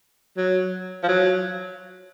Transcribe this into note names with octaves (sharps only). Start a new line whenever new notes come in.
F#3
F3
F#3